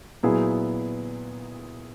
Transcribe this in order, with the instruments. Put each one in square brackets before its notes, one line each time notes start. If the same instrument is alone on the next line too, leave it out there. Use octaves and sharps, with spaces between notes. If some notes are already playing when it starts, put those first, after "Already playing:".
[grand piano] A#2 F#3 B3 E4 G#4